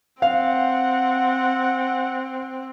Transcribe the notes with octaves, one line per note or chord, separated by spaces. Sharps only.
C4 F5 F#5